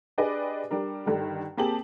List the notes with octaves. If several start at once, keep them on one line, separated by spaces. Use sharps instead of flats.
D4 G4 G#4 B4 D5 D#5
G3 D4 A#4
G2 D3 D#3
A#3 C4 G4 G#4 A5 F#7